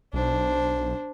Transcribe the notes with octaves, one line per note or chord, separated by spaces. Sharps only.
B1 D4 C5